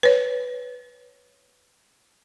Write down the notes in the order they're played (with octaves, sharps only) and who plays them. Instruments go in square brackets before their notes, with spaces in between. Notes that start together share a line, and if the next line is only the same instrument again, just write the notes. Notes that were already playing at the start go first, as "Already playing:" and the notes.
[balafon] B4 C#5